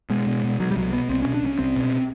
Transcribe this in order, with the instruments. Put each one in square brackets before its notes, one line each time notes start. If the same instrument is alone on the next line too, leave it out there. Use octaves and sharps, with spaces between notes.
[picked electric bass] B2 G#3
B2
B2
B2 F#3
G3
C2 F#3
B2 B3
C2 C4
B2 C#4
D4
C2 C#4
C2 C4
B2